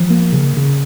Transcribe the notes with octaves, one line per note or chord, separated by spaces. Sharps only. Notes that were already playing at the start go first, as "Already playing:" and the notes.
Already playing: F3
A#3
C#3
C#3